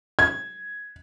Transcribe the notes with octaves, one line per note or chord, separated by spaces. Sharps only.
G#6